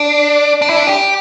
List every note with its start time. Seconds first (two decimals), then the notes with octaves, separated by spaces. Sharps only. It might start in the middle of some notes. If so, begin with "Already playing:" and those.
Already playing: D4
0.62 D4
0.69 E4
0.76 D4
0.87 G4